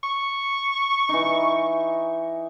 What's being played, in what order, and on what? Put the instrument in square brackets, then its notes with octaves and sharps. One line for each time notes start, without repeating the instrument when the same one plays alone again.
[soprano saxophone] C#6
[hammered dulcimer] E3 D#4